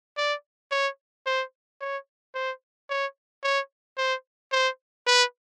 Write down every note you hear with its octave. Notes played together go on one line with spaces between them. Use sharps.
D5
C#5
C5
C#5
C5
C#5
C#5
C5
C5
B4